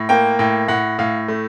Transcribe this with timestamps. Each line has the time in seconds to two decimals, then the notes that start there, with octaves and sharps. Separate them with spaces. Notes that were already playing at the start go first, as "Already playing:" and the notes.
Already playing: A2
0.09 A#3 G5
0.39 A2 G5
0.68 A2 F#5
0.99 A2 F5
1.28 A3